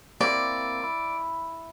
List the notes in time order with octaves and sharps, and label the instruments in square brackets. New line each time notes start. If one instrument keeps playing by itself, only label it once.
[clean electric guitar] A#3 C4 E4 [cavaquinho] D5
[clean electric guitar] E4